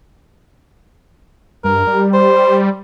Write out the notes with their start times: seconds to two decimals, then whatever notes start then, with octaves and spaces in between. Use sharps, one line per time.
1.64 G2 A#4
1.87 G3
2.13 C5